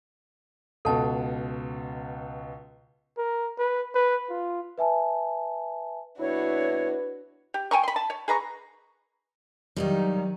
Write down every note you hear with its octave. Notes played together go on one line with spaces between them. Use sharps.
C#2 B2 A4 A5
A#4
B4
B4
F4
B4 E5 G#5 A5
C2 B3 D4 E4 F#4 B4 C#5
G4
G5 G#5 A#5 C#6
B5 C6
A5
C#5
G#4 B4 A#5 C#6
D#3 F#3 G3 A#3 D#4